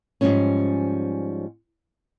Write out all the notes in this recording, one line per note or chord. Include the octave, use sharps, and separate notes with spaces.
G#2 E3 F3 G3 C#4